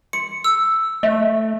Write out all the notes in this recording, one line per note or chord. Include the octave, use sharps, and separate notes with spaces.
C6 C#7
E6
A3 D#5 E5